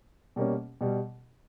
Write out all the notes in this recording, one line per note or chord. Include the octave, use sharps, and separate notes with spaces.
B2 G3 A#3 C#4
B2 G3